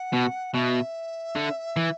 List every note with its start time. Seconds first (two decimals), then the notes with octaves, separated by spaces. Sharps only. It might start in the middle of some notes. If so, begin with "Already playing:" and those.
Already playing: F#5
0.13 B2
0.54 B2 E5
1.36 D3
1.77 E3